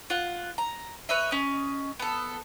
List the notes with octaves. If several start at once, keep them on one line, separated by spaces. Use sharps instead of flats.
F4 F#5
A#5
B4 C#5 D#5 E5
C#4 D#5
B3 A4